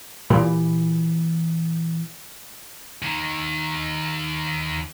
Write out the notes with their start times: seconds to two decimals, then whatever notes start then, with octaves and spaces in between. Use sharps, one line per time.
0.30 A#2 E3 G4 B5
3.02 D#2 D#3